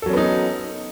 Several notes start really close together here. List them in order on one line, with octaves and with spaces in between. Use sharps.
A4 F#3 C#4 B3 D#4